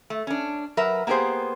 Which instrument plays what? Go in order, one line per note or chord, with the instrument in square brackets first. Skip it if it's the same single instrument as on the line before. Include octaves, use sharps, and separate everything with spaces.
[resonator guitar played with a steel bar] A3
C#4 D4
F#3 A#4 B4 E5
A#3 B3 G4 G#4 C5